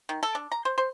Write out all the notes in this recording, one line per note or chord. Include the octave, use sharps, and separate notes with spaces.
D#3
A4
D4
A#5
C5
C5